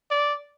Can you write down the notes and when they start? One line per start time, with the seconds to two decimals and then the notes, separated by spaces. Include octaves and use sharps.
0.11 D5